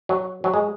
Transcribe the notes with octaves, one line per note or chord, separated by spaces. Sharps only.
F#3
F#3
G#3